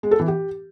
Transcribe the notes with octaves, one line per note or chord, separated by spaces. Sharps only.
G#3
A4
E3
G4